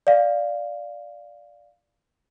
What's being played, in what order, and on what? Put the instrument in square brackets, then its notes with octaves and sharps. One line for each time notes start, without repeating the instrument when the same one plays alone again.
[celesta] D5 F5